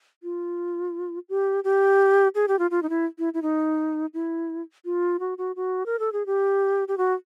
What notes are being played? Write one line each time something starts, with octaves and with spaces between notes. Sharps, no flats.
F4
G4
G4
G#4
G4
F4
F4
D#4
E4
E4
E4
D#4
E4
F4
F#4
F#4
F#4
A#4
A4
G#4
G4
G4
F#4